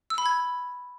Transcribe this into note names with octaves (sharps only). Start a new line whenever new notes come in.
E6
B5
G#6